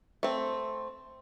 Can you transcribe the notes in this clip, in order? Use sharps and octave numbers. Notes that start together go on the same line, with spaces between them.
A3 C4